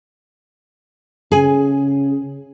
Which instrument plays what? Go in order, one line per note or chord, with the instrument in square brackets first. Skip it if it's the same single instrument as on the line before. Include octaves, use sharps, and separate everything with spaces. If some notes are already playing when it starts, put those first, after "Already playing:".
[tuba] C#3 [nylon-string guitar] G#4 G#5